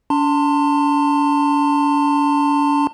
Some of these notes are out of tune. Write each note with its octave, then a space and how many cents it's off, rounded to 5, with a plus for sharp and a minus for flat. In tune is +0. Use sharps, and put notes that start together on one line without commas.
D4 -45 A5 +30 C6 +0